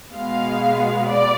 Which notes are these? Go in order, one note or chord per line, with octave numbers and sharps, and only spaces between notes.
B2 G#3 B3 F5
D5